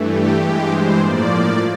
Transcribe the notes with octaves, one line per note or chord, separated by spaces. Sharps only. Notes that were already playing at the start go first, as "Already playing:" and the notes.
Already playing: G2 E3 A3
G4
G2 E3 G#3 G4
C5
A2 F3 A#3 D5